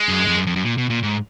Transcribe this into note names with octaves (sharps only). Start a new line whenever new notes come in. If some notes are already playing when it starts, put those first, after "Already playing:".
Already playing: G#3
F#2
F2
F#2
F2
F#2
A#2
B2
A#2
G#2